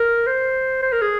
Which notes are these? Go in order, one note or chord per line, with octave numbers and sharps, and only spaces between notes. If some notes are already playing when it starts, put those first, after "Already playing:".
Already playing: A#4
C5
C5
A#4
G#4